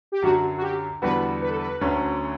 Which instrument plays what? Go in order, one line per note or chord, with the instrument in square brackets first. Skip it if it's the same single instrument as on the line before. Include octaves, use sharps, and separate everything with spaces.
[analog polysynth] G4
[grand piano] F#2 D3 F#3 [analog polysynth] F#4
[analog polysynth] F#4
G4
[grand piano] E2 D3 G3 B3 F#4 [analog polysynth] B4
[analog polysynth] B4
A4
B4
[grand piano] D2 D3 F#3 C#4